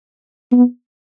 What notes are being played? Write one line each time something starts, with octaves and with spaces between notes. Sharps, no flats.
B3